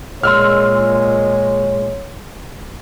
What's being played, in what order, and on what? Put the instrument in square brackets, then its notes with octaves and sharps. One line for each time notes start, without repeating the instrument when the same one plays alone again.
[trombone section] A#2 G#3 [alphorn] C#5 [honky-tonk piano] C6 E6 F6